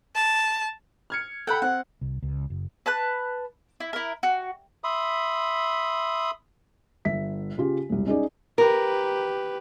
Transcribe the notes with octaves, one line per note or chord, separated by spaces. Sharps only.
A5
F6 G#6 C#7
A4 F#5 G5 B5
C4 F#5
C2
C#2
F#1
B4 A5 F#6
E4
E4 A#4
F#4
E5 B5 C6 D#6
G1 E5 B6
C#3 F4 G4
E1 C2
C#4 D#4 G#4 D5
G4 A#4 B4